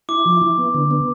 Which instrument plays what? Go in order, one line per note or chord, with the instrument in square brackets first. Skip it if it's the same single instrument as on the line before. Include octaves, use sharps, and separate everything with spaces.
[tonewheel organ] E4 [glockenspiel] D6
[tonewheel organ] F3
E4
B3
D3
B3